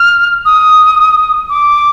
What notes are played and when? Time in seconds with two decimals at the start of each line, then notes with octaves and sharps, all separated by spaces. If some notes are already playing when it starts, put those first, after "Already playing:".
Already playing: F6
0.45 D#6
1.49 D6